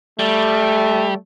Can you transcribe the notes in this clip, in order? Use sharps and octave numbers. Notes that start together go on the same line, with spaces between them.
G3 A3